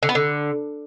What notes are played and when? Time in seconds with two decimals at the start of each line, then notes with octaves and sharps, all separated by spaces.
0.03 D3
0.09 B3
0.15 D3